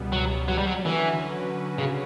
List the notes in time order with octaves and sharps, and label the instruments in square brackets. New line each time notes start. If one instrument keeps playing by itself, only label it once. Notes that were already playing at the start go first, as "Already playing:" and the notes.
Already playing: [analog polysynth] C#2 B2 G3 B3
[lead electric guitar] F#3
F#3
G3
F#3
[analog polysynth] D3 F#3 C#4 F#4 B4 [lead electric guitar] E3
[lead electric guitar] C#3